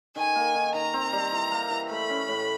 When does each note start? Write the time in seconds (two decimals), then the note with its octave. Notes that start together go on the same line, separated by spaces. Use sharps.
0.16 D#3 G#5
0.35 A#3
0.55 D#3
0.74 D#3 A#5
0.93 C4
1.13 G3
1.32 E3
1.52 A#3
1.70 E3
1.90 A3 B5
2.10 C#4
2.28 A2